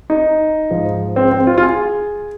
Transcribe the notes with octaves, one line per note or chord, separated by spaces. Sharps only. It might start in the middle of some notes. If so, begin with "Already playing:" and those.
D#4
G#2 F3
C4
C4
F4
F4
G#4